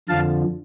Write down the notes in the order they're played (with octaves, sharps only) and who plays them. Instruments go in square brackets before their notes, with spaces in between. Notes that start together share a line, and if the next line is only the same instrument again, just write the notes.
[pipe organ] F2 D3 F3 F5 A5